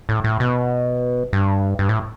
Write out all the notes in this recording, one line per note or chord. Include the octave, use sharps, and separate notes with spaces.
A2
A2
B2
G2
G2
A2